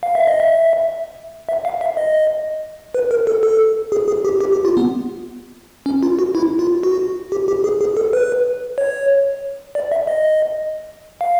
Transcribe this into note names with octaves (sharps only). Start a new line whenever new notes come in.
F5
E5
D#5
E5
E5
F5
E5
D#5
B4
A#4
A4
A4
G#4
G#4
G4
G4
G4
F4
B3
C#4
F4
F#4
E4
F4
F#4
G4
G4
G#4
G#4
A4
B4
C#5
D5
E5
D#5
F5